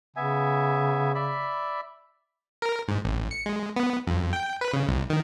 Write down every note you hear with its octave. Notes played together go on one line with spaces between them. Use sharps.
C#3 B3 E5 G#5
D5 E5 B5
A#4
G#2
A1
C#7
G#3
B3
F2
G5
B4
C#3
C2
D#3